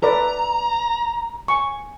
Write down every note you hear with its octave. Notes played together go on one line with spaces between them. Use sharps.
A4 B4 D5 A#5
G#5 C#6